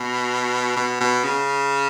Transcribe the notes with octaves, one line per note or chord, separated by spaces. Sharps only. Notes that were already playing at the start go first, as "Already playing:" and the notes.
Already playing: B2
B2
B2
C#3